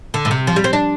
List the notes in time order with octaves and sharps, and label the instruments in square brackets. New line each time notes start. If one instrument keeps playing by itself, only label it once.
[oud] D3
A2
C3
F3
G3
C4
D4